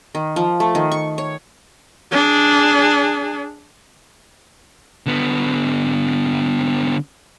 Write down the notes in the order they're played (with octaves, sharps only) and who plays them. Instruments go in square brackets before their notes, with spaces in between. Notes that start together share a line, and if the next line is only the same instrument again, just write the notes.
[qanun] D#3
F3
A3
D#3
C#6
C#5
[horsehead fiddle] D4 G#4
[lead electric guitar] D3 B3